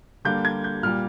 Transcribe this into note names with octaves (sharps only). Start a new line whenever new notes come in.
D3 G3 A#3 G6
G#6
G6
A#2 G3 A#3 F6